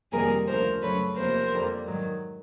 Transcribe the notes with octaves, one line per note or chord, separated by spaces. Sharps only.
F2 C3 D#3 G3 A#3 G#4 A#4
D2 C#3 F3 A#4 C5
F#2 C#3 F#3 A3 B4 C#5
E2 C3 F3 A#3 A#4 C5
F2 D3 G3 A#3
G#2 D#3 F#3